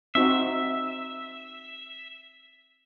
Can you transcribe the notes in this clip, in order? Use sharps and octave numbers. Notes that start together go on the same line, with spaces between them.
C4 D#4 F#4 E5